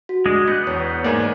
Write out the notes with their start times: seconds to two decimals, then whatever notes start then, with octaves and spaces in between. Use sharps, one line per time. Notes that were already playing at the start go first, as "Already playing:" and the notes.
0.09 F#4
0.26 G#3 D4 D#5
0.48 B3 F#6 G6
0.67 E2 C#5
1.04 G#2 A#3 D5 G#5